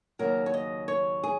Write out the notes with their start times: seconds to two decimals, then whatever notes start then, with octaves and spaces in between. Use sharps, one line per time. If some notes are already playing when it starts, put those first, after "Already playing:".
0.19 D#2 C#3 F#3 A#4
0.46 C#5
0.54 D#5
0.88 C#5
1.23 G#4